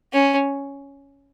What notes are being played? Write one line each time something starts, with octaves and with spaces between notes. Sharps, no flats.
C#4